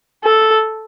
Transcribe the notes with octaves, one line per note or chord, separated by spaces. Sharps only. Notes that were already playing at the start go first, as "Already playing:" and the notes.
A4